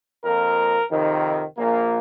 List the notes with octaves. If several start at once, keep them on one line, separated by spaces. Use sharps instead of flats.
F2 F3 A#3 A#4
F2 C3 D#3
A#1 A#2 A#3